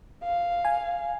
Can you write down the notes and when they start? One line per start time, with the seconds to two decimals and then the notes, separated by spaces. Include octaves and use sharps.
0.23 F5
0.65 G#5